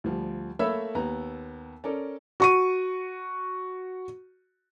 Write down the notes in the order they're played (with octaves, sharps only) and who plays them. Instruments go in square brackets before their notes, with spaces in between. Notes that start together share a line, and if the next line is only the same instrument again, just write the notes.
[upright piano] D2 F3 G3
A3 A#3 C#5 E5 B5 E6
D#2 B3 A#5
C#4 A4 A#4 D5
[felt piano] F#4 C#6 D#7